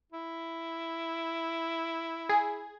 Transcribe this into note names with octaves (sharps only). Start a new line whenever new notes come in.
E4
G#4